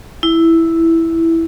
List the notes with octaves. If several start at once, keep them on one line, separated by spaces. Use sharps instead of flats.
E4